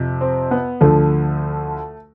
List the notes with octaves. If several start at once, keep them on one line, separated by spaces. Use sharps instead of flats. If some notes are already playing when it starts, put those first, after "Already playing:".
Already playing: F2 C3 F3
C4
B3
D2 D3 F3 A3